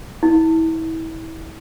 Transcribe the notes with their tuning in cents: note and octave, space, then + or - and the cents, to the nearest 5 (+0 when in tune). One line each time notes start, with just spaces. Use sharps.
E4 -30